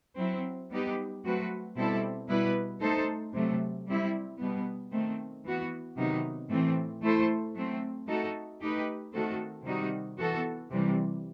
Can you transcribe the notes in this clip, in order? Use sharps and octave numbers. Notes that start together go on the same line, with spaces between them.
F#3 C4 E4
G3 B3 D#4 G4 B4
F#3 A3 C4 F#4 B4
B2 G3 C4 E4 A4
B2 G3 B3 E4 B4
A3 D#4 A4 C5
C3 F#3 A3
G3 C4 E4
B2 G3 B3
D#3 A3 C4
E3 B3 F#4
C3 D#3 F#3 B3 D#4
A2 E3 A3 C4
A3 E4 A4 C5
F#3 A3 C4
A3 D#4 F#4 A4
A3 D#4 G4 B4
D#3 A3 C4 F#4 A4
C3 D#3 G3 D#4 F#4
E3 B3 F#4 A4
C3 E3 G3